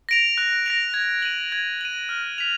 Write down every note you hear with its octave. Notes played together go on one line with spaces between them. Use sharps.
A#6 D7 F7
F#6
A#6 D7 F7
G#6
D#7 F#7
G#6
D#7 F#7
F6
B6 F7